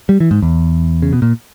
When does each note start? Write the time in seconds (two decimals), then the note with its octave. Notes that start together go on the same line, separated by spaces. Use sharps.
0.09 G3
0.20 E3
0.31 G#2
0.42 E2
1.02 C#3
1.13 B2
1.22 A#2